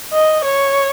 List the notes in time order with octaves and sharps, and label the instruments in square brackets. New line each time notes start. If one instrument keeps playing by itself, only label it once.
[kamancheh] D#5
C#5